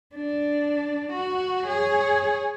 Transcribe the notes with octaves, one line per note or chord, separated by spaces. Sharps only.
D4
F#4
G#4 C#5